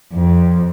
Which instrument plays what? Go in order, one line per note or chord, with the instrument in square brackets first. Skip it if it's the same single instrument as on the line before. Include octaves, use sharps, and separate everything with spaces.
[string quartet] F2